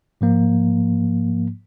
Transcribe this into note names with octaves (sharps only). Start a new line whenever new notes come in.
G#2 F3 A#3